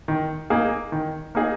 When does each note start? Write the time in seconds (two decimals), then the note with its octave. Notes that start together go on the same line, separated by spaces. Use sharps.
0.08 D#3
0.50 A#3 D#4 G#4
0.92 D#3
1.35 A#3 D#4 G#4